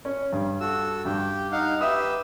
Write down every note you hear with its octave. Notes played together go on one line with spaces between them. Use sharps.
C#4
G2
F#4 A4 E6
G2 G4
D#4 F5 F#5
G4 B4 E5 D#6 E6